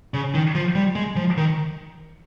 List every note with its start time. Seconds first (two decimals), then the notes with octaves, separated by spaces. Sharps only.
0.14 C#3
0.35 D#3
0.55 F3
0.75 G3
0.95 G#3
1.16 F3
1.37 D#3